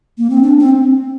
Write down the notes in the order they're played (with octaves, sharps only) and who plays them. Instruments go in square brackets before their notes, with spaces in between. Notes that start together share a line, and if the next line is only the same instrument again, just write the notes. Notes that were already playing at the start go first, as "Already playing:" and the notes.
[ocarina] A#3
C4
D4
C4